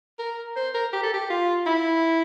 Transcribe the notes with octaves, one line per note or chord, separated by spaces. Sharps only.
A#4
C5
A#4
G4
A4
G4
F4
E4